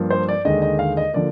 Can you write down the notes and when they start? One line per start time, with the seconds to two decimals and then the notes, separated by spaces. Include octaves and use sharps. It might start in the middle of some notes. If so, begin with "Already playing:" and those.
Already playing: G2 F3 A#3
0.10 C5
0.29 D5
0.45 D#2 D3 G#3 D#5
0.62 D#5
0.79 F5
0.97 D#5
1.13 D3 F3 A#3 D5